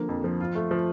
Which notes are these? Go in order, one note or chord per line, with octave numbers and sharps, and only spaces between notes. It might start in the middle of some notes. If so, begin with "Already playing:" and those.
Already playing: D3 F3 A#3
F2
F3
F4
A3
F3